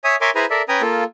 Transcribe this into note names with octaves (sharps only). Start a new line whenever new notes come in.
C#5 E5 G#5 D#6
A#4 C#5 E5 G#5 C6 D6
E4 G#4 B4 C5 G#5 A#5
A4 A#4 D5 E5
C#4 B4 G5 G#5 A#5 D#6
A#3 F4 A4